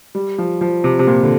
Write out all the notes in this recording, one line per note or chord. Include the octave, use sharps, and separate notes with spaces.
G3
F3
F3
C3
C3
A#2
D3